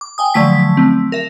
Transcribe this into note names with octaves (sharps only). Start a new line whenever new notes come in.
D6
G5 G#5 D#6
D3 F3 F#3 A3 A5 B6
A3 C4
A#4 E5